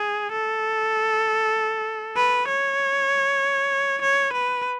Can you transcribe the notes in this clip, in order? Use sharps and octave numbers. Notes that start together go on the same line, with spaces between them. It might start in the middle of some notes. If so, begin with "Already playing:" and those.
Already playing: G#4
A4
B4
C#5
C#5
B4